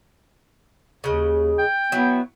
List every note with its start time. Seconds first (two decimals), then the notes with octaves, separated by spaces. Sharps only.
1.04 D#2 C#3 G#3
1.59 G5
1.92 F#3 B3 E4